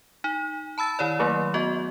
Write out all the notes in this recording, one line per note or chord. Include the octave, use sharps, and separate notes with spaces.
D#4
A5 B5 E6 A6
D#3 E4 C#5 D5
D#3 F#3 A3 A#3
B3 F#4 D#5